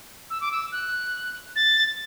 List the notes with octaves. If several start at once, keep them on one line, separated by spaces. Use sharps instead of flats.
E6
D6
E6
F#6
A6